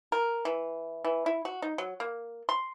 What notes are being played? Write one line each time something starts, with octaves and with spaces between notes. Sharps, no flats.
A#4
E3
E3
E4
F#4
D#4
F#3
A#3
C6